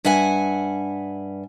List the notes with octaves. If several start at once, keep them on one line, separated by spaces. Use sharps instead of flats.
G2 E5 F#5 G#5